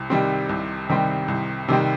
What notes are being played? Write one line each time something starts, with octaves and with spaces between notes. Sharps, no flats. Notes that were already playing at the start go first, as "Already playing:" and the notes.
Already playing: C2 C3
C3 D#3 G3 C4
C2
C3 D#3 G3 C4
C2
C3 D#3 G3 C4